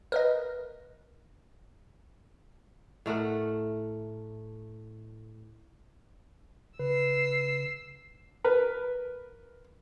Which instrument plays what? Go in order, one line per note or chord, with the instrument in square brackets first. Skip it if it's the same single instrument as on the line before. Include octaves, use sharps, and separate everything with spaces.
[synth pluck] A#4 B4 D#5
[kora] A2 A3 A#4 F#5
[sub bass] C#3 [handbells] B4 [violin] E6 C7
[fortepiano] A#4 B4